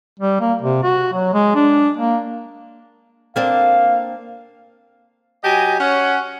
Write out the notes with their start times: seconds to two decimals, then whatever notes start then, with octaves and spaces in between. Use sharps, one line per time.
0.20 G3
0.40 A#3
0.62 C3
0.83 F#4
1.13 F#3
1.33 G#3
1.55 D4
1.97 A#3
3.36 A#3 C4 D4 F5
5.43 F#3 G4 D#5 G#5
5.78 C#4 F#5